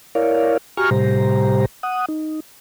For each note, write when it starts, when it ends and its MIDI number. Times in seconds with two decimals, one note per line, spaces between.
0.15 0.57 64
0.15 0.57 70
0.15 0.57 73
0.15 0.57 74
0.15 0.57 77
0.77 0.90 66
0.77 0.90 67
0.77 0.90 80
0.77 0.90 82
0.77 0.90 85
0.77 0.90 89
0.91 1.65 45
0.91 1.65 48
0.91 1.65 55
0.91 1.65 67
0.91 1.65 72
0.91 1.65 82
1.83 2.06 78
1.83 2.06 87
2.08 2.40 63